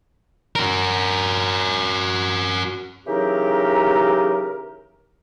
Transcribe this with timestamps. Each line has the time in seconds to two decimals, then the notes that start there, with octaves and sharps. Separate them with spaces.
0.56 F#4 A#4
3.06 C#3 E3 F#3 D#4 G4 A#4